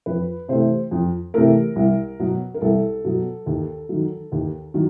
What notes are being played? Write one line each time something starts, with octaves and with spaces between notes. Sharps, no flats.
F2 B4
C3 E3 A3 C5
F2
C3 E3 A3 A#4
C2
B2 F#3
A#4
C2 A4
B2 F#3
D#2
D#3 F#3
D#2
D#3 F#3